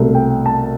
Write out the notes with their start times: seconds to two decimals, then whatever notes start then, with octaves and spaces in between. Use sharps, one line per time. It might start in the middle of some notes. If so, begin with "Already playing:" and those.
Already playing: C2 B2 A3
0.15 G5
0.46 A5